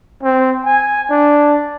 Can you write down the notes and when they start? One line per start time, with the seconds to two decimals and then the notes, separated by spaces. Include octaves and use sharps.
0.23 C4
0.65 G#5
1.10 D4